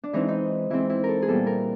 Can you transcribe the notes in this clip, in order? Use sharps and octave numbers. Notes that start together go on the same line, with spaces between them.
D4
E3 G#3 C4 D#4
D#4
E3 G#3 C4 E4
E4
A#4
A4
G#4
A#2 G3 B3 A4
A#4